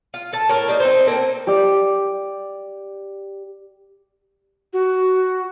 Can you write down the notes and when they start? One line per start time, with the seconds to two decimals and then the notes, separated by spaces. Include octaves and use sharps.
0.14 F4
0.33 A4 A5
0.49 A2 A#4
0.68 G3 A#3 D#4
0.80 C4 D#4 C5
1.07 A#3 C4 A4 A#4
1.47 G4 D5
4.73 F#4